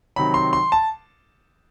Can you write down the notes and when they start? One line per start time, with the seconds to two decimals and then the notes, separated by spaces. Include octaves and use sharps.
0.16 C3 D#3 F#3 B5
0.34 C6
0.53 C6
0.72 A5